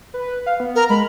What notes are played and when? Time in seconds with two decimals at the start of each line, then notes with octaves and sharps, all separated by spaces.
0.14 B4
0.46 F5
0.60 B3
0.75 A#4
0.89 G#3 B5